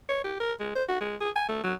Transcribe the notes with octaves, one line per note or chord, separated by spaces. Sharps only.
C#5
G4
A#4
G#3
C5
F#4
G#3
G#4
G#5
A3
F#3